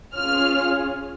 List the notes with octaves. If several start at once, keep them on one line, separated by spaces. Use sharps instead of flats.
C#4 F4 G#4 F6